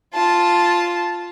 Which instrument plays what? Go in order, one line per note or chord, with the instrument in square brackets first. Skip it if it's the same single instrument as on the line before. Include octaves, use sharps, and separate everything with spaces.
[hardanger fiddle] F4 A5